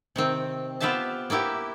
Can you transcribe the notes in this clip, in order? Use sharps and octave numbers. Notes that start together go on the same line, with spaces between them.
C3 D#3 C4
B3 F4 G4 C5 E5 A5
A#3 B3 E4 G4